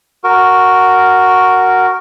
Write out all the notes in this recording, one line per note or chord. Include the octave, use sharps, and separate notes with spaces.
F#4 A#4